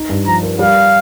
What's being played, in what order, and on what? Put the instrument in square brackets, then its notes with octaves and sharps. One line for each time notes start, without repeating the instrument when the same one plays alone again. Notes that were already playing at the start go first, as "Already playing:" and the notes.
Already playing: [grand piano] D#4
G2
[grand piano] F3 [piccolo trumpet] A#5
[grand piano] A#4
[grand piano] G3 [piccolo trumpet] F5